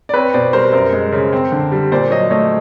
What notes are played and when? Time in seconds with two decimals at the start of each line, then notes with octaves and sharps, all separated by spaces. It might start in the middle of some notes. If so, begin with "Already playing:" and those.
0.09 D5
0.14 C4 B4 C#5
0.34 B2 C5 D5
0.53 G3 A#4 C5
0.73 F#2 A#4 C5
0.92 G#3
1.12 C#3
1.33 C4
1.52 D3
1.72 G3
1.92 A#2 C5 D5
2.11 F#3 C#5 D#5
2.30 A3 C#5 D#5